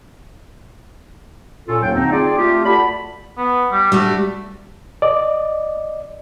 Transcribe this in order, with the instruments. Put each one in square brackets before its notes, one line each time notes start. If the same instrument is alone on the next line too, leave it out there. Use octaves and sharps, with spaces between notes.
[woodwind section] A#2 C#4 F4 A4
D#2 G#2 F#3 G5
D3 A3 C4 D#4
C4 D#4 F4 G#4 D5
A3 F4 G4
F#4 A4 D5 B5
[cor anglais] B3
G3
[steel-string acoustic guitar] G3 D4 F#4 [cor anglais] A3
[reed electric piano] D5 D#5